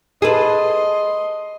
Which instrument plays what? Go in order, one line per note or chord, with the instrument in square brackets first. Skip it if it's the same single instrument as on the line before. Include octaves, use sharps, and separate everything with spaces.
[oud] G#4 A4 B4 [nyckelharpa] D#5 C6